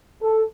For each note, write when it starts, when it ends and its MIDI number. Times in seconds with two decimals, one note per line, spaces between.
0.22 0.43 69